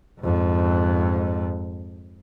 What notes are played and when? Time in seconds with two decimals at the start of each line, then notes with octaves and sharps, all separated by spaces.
0.20 F2 G#2